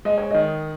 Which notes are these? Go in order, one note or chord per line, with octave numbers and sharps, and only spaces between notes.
G#3 D#5
C#5
D#3 D#5